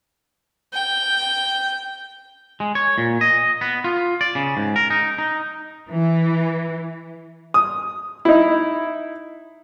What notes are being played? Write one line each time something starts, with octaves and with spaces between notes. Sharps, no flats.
G5
G#3
C#5
A#2
D#5
B3
F4
D5
C#3
G#2
A#4
D#4
D#4
E3
D#6
D#4 E4